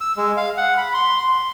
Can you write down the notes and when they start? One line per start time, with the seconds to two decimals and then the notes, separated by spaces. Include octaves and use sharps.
0.01 E6
0.17 G#3
0.37 F5
0.57 F#5
0.77 B5
0.94 C6
1.21 C6